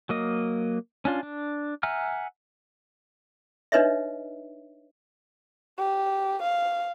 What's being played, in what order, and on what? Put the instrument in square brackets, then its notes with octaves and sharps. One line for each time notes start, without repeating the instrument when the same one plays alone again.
[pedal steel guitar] F#3 A#3 D#5
C#4 D4 F4
D4
E5 F#5 G#5 A#5 F6
[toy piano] D4 D#4 B4 C#5 D#5 E5
[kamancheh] G4
F5